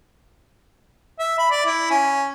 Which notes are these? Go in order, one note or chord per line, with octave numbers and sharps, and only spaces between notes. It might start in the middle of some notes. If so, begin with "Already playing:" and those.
E5
B5
D5
E4
C#4